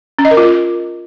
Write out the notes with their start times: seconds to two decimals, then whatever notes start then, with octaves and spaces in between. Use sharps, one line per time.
0.19 C#4
0.25 D#5
0.31 A#4
0.37 F4